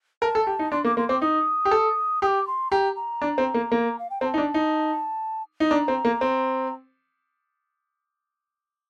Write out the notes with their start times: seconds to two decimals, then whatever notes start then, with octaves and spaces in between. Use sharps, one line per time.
0.22 A#4 A5
0.35 A4
0.47 G4
0.59 D#4
0.72 D4 C6
0.84 A#3 D6
0.97 A#3 C6
1.09 C4 D6
1.22 D#4 D#6
1.65 G4
1.71 A4
2.22 G4 D#6
2.27 D6
2.47 C6
2.71 G4 A#5
2.96 A#5
3.22 D4
3.38 C4
3.54 A#3
3.72 A#3
3.99 F5
4.10 G5
4.21 C4 A#5
4.26 A5
4.34 D#4
4.38 D4
4.54 D#4
5.60 D#4
5.70 D4 A#5
5.88 C4
6.05 A#3
6.21 C4